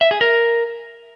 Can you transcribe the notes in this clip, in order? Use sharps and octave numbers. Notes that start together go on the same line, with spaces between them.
E5
G#4
A#4